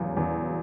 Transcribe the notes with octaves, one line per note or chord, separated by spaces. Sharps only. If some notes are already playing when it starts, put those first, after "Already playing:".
Already playing: E2 C#3 F#3
E2